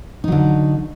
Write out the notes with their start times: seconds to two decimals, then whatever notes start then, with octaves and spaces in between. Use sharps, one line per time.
0.24 D#4
0.28 F#3
0.32 D3